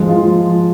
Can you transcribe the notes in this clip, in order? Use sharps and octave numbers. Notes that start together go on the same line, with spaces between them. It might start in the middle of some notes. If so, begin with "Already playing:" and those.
Already playing: F3 G#3
F4